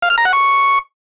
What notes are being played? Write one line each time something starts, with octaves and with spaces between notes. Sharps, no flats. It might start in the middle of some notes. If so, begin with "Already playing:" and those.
F5
F6
A#5
F#5
C#6